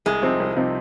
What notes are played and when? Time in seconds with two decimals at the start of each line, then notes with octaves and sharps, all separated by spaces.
0.06 C2 G#3
0.22 C3 F3 C4 D#4
0.40 C2
0.56 C3 F3 C4 D#4